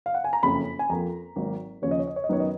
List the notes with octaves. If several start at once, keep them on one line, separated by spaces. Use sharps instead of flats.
F5
F#5
G#5
A#5
F#1 F2 C#3 B5
G#5
F2 F3 A#3 A#5
G#1 G#2 F#3 A#3
D#2 C#3 F3 A#3 C#5
D#5
C#5
D#5
C#5
D#5
F#2 D#3 F#3 B3 C#5
D#5